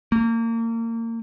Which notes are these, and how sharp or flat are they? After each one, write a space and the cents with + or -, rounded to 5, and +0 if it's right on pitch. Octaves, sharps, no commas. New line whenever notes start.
A#3 -30